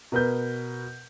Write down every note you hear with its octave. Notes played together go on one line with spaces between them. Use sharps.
B2 A#4 B4 G6